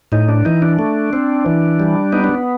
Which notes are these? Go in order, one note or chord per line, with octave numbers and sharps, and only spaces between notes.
A2 D#4
D4
E3 D#4
D4
A3
C4
E3
G3
B3 D#4
D4